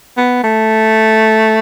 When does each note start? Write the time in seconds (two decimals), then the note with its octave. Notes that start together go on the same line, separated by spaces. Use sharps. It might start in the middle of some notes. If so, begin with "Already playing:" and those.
0.17 B3
0.44 A3